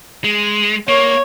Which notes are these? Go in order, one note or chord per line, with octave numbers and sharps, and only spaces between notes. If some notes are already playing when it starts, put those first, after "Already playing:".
G#3
A#3 C#5